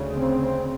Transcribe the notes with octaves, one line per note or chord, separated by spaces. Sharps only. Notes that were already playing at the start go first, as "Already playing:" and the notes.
Already playing: D2 C#3
C4